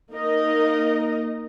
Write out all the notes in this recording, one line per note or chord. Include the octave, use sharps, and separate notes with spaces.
A#3 D#4 A#4 D#5